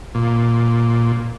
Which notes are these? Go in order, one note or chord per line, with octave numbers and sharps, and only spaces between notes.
A#2